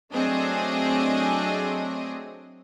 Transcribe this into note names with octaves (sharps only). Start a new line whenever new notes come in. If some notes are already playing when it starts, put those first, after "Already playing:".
F#3 A3 C4 D4 G#4 D#5